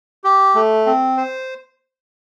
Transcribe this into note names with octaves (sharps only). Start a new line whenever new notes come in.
G4
A3
C4
C5